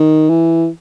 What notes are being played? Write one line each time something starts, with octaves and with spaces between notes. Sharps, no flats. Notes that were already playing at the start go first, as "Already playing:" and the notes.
Already playing: D#3
E3